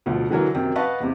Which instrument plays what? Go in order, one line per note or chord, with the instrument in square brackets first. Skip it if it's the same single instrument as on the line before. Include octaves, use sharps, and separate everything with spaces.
[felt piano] D2 B2 F3
D3 E3 F#3 A#4
F#2 C3 D#3 G5
B4 D#5 F5 F#5 A5 C#6
E2 C3